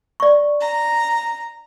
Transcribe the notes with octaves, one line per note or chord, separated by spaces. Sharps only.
D5 C#6
A#5